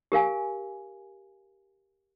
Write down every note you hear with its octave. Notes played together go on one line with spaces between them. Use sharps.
G4 A#4 F5 G#5